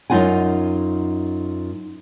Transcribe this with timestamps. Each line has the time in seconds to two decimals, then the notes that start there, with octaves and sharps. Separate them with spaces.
0.10 F#2 F#3 D#4 F4 F#5 G#5